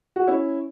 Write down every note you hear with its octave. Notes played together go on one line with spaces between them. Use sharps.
F#4
C#4 E4